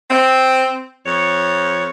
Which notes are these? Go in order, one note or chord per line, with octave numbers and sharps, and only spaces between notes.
C4
F2 C#5